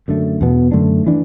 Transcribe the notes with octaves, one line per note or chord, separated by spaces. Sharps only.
F#2 D3 A3
E2 B2 B3
F#2 D3 A3 D4
E3 D4